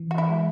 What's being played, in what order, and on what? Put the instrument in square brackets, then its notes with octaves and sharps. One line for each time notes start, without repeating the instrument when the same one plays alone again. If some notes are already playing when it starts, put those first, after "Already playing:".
Already playing: [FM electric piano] E3
[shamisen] F#4
E4
[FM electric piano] G#3